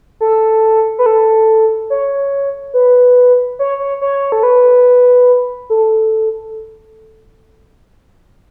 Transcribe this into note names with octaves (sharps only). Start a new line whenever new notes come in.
A4
B4
A4
C#5
B4
C#5
C#5
C#5
A4
B4
A4